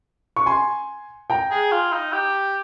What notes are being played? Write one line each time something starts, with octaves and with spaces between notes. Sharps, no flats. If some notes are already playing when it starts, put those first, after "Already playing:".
C#6
G#5 C6
G5 A#5
G#4
F4
D#4
G4